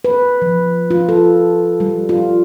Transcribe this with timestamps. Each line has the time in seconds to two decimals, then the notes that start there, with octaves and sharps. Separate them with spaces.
0.05 B4
0.42 F3
0.91 F4
1.09 A4
1.80 G3
2.09 F4